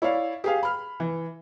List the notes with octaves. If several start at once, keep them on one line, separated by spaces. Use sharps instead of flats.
E4 C#5 D5 F5
G4 G#4 F5
B5 F6
E3